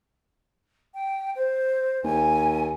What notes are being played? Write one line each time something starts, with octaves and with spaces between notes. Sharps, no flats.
G5
C5
D#2 G#5